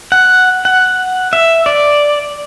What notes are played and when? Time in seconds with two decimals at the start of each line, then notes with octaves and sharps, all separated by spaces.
0.12 F#5
0.65 F#5
1.33 E5
1.66 D5